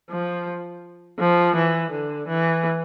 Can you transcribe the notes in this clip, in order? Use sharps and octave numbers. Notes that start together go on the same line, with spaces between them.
F3
F3
E3
D3
E3